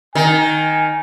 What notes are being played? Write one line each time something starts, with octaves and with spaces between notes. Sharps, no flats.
D#3 G#5